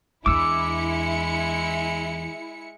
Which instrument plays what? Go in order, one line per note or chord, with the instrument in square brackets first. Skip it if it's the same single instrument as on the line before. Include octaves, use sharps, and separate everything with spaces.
[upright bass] E2 D4 [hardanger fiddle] G#3 [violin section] E4 C#7 [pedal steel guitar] D6 E6